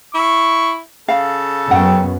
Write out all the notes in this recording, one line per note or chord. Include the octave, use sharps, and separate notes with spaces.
E4 C#6
C#3 A4 F5
F#2 B3 F#5 G5